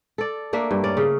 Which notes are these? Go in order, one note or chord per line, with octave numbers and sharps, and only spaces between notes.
A4 D5
A3 A#3 D4 E5
G2
C#4 D5
C#3